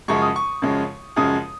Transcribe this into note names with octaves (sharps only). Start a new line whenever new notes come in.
F#2 C#3 F3 G#3 C#6
D#6
C#6
F#2 C#3 F3 G#3
F#2 C#3 F3 G#3 D#6